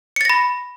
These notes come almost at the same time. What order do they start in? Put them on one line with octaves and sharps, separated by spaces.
C#7 A6 A#6 B5